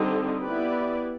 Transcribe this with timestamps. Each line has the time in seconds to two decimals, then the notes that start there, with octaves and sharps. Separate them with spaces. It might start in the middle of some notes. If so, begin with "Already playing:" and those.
Already playing: D3 G3 C4 D#4
0.42 B3 E4 G4 B4 D5